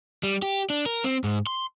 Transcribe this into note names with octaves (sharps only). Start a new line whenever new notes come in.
G3
G4
D4
A#4
C4
G#2
C6